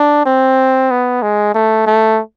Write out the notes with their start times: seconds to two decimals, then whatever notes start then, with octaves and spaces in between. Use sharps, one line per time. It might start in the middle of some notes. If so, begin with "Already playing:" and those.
Already playing: D4
0.26 C4
0.91 B3
1.22 G#3
1.54 A3
1.86 A3